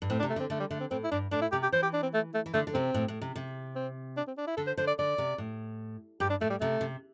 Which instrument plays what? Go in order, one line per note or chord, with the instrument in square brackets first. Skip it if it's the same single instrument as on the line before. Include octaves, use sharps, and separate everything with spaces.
[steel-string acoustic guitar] G2
[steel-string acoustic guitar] A2 [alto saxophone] C4
[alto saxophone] D4
[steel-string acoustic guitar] C3
[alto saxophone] A3
[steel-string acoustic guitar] D3 [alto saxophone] C4
[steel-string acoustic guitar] D3 [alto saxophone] A3
[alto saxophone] G3
[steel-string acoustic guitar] D3 [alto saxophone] A3
[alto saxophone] C4
[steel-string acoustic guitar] A2 [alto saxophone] C4
[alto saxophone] E4
[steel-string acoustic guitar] G2 [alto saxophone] D4
[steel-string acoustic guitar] A2 [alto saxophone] D4
[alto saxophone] E4
[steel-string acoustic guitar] C3 [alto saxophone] G4
[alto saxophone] G4
[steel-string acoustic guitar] E3 [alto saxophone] C5
[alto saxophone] G4
D4
C4
A3
A3
[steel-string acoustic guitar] E3
[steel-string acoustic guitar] D3 [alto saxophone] A3
[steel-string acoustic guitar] D3
[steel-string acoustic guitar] C3 [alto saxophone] C4
[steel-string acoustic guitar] A2
A2
C3
C3
[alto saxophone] C4
D4
C4
D4
E4
[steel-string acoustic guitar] D3 [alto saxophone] A4
[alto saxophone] C5
[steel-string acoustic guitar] D3 [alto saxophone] C5
[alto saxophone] D5
[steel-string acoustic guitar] D3 [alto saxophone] D5
[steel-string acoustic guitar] C3
A2
[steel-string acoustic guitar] G2 [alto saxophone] G4
[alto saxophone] D4
[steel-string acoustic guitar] A2 [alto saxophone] A3
[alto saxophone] G3
[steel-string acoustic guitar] C3 [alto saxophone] A3
[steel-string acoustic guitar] C3